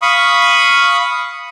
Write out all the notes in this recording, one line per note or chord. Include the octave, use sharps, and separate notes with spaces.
F5 B5 C#6 D#6